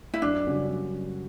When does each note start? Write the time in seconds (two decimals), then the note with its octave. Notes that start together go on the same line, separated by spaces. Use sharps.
0.14 E4
0.22 F#2 D4
0.47 C#3 G3 C#4 F#4
0.71 F#2